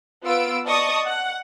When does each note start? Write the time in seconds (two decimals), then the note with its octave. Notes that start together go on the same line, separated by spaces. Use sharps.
0.24 B3 F4 E6 D7
0.66 D5 D#5 A5 C#6 D#6
1.06 F#5